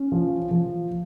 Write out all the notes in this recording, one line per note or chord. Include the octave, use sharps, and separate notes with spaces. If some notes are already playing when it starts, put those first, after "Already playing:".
Already playing: C#4
F3
F3